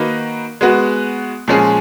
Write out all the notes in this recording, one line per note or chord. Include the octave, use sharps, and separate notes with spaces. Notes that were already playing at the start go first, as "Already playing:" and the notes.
Already playing: D#3 A#3 D#4 F#4 B4
G#3 B3 F#4
A#2 F3 G#3 C#4 G#4